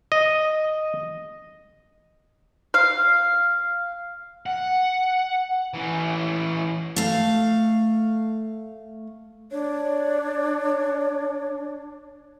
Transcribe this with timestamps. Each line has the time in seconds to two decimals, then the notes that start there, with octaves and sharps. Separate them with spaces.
0.12 D#5
2.74 F5
4.46 F#5
5.74 E3 C#4
6.96 A3 F5
9.51 D4 C#5